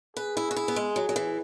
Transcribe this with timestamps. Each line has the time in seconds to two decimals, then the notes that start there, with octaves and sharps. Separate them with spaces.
0.17 G#4 B4
0.37 E4
0.51 F#4
0.56 E4
0.68 B3
0.76 G#3
0.96 F#3
1.09 F#3
1.16 E3